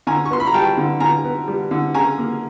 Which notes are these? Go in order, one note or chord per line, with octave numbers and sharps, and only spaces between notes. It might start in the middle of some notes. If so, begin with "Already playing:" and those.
D3 G#5 A#5
C#6
B3 C6
B5
A#5
G3 G5 A5
D3
D3 G#5 A#5
B3
G3
D3
C#3 G#5 A#5
A#3